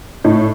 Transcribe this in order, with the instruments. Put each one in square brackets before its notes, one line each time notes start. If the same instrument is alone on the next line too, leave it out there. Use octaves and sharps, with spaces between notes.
[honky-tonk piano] A2 [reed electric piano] D#4